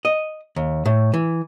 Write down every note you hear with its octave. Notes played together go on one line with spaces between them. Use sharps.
D#5
D#2
A2
E3